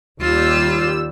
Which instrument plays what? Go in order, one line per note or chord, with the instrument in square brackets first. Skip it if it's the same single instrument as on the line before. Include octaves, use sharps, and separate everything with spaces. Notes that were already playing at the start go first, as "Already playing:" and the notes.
[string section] D#2 G3 E6 [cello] F4